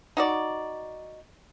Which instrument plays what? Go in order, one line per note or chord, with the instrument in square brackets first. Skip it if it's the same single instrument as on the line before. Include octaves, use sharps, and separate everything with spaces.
[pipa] D#4 F#4 D5